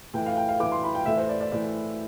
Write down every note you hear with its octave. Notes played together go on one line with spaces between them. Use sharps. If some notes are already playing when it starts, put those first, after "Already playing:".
A2 E3 G5
F5
G5
F5
A2 E3 D6
C6
B5
G5
A2 E3 E5
C5
D5
D5
A2 E3 D5